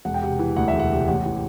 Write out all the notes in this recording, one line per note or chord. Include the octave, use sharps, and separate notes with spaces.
E1 F#5
G5
C3 F#5
E3
D2 F#5
E5
E1
F#5
C3
A1 F#5
E3